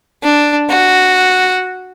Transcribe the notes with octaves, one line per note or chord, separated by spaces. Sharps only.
D4
F#4